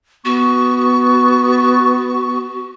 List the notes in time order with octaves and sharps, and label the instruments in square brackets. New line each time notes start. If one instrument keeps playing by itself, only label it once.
[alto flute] B3 [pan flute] F#4 [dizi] C#6